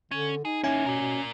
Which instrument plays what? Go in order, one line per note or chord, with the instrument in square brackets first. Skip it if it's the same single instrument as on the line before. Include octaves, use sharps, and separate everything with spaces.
[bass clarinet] D3 [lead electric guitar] C#4
[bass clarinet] D#4 [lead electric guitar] G#4
[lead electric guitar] A#3 E4 [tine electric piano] C#4 G#5
[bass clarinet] B2 [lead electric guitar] A#4 D5
[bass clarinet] B2